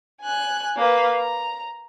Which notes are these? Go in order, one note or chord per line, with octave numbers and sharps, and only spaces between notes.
G#5 F#6
A#3 B4
A#5